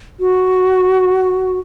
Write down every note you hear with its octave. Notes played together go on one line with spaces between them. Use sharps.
F#4